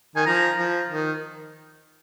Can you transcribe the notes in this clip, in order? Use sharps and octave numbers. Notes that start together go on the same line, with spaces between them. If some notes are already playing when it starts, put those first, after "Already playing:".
D#3 G#5
F3 A#5
F3
D#3